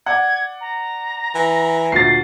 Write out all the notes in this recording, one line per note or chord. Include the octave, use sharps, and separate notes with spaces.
D5 F#5 G#6
A#5
E3
D2 A#2 A6 C7